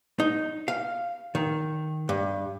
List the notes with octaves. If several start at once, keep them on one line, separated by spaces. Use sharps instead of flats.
D#4
F5
D#3
G2